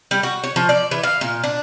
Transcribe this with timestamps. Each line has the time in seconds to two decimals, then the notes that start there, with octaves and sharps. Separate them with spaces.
0.11 G3
0.23 F#4
0.44 C#5
0.56 F3
0.69 D5
0.91 E3
1.03 F5
1.21 A#2
1.44 D4